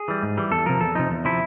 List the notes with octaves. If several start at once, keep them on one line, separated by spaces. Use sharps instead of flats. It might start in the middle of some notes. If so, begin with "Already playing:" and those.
Already playing: G#4
E3 G3
G#2
E3 G3
E2 A4
C3 F3 A#4
E2 A4
C3 F3 D#4
E2
C3 F3 E4